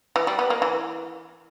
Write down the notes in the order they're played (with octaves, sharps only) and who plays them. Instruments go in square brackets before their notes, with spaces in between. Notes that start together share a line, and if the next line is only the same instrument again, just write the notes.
[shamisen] E3
G3
B3
A#3
E3